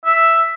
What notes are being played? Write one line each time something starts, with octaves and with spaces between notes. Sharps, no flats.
E5